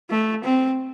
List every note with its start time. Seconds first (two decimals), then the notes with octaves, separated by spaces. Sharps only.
0.10 A3
0.44 C4